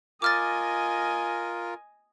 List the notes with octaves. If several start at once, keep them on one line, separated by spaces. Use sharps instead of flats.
F4 A#4 D#5 G#5 D6 F6 A6